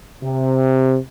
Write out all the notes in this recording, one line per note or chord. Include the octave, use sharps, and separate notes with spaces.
C3